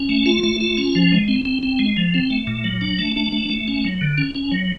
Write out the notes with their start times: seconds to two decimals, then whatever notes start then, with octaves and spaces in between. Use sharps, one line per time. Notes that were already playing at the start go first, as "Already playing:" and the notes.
Already playing: C#4
0.09 A3
0.26 F4
0.43 A3
0.61 F4
0.77 C#4
0.95 F3
1.12 G#3
1.28 C4
1.45 C4
1.63 C4
1.79 G#3
1.97 F3
2.14 C4
2.30 A3
2.47 A#2
2.64 F#3
2.81 D4
2.99 A3
3.16 D4
3.32 A3
3.50 A3
3.68 C#4
3.85 F#3
4.01 D3
4.18 C#4
4.35 C#4
4.52 F#3